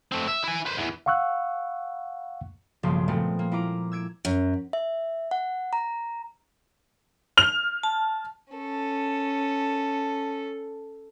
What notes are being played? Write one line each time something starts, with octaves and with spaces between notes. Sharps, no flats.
A3 C4
E5
E4 G#5
B4 C5
E2 E3
F5 F#5 C#6 E6 F#6
B1 G2 C#3 F3 A#3 C6
A#2 F3 G#3 A3 B3 C4
A#3
E4 F4 A#5 D6
E6 G#6 D7
F#2
E5
F#5
A#5
F6 F7
A5
C#4 A4